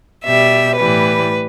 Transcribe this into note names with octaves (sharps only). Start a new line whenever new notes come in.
B2 G3 E5
A2 E3 G3 B4